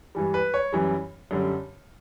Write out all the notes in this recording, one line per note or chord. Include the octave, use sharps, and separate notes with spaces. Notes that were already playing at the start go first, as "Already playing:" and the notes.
G2 E3 G3
B4
C#5
F#2 E3 G3
F#2 D3 G3